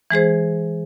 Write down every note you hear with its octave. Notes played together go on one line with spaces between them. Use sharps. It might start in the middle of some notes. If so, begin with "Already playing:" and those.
E3 G#3 G#4 C5